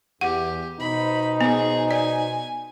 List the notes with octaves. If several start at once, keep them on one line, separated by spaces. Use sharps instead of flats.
E2 G4 F#5
B2 D#4 C5 B5
B3 G#4
D5 G#5